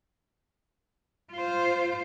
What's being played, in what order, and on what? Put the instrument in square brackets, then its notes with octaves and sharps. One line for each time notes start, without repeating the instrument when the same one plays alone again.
[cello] F4 C5